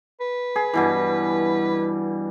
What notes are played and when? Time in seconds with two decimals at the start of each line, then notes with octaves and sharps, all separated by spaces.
0.21 B4
0.56 G#4
0.73 G2 B2 E3